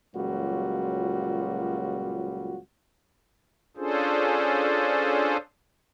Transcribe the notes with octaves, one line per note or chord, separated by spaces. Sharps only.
C#2 A#2 F#3 G3 F4 F#4
C#4 D4 F4 G#4 A4 C5